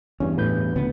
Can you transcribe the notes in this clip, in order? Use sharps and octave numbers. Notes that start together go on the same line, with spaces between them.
E2 G2 C#4
A2 B4 G6
D2 C#3 B3